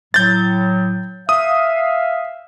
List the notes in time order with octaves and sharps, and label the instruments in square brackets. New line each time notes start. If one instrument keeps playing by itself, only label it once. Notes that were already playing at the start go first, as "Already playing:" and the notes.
[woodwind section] A2 F#3 [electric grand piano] G6 A6
[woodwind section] E5 F5 [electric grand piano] D#6